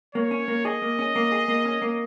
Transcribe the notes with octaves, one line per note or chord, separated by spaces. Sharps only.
A#3 C#5
C#4
A#3
G#4 D#5
A#3
C#4
A#3
G#4
A#3
C#4
A#3